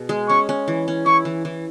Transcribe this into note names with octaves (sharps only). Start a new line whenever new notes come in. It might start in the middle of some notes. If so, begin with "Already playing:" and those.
Already playing: B2 G#4
G#3
C#4 C#6
C#4
E3
C#4
E4 C#6
E3
E3